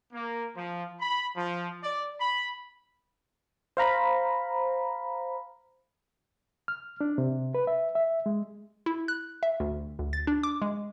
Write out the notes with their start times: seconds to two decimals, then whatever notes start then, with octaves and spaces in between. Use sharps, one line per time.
0.13 A#3
0.56 F3
1.00 B5
1.37 F3
1.83 D5
2.21 B5
3.77 C5 F5 A#5 B5
6.68 F6
7.01 D4
7.18 C3
7.55 B4
7.67 E5
7.95 E5
8.26 G#3
8.86 E4
9.08 F#6
9.43 E5
9.60 D2
9.99 D2
10.13 A6
10.27 D4
10.43 D6
10.62 G#3